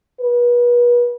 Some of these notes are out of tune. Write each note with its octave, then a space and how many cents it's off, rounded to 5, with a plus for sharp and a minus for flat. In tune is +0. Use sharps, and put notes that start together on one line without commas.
B4 -35